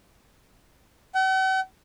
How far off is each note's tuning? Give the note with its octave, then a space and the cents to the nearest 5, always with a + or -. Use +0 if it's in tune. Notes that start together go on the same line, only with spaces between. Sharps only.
F#5 +45